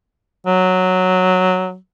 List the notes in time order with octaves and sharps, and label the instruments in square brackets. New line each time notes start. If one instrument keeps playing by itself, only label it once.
[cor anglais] F#3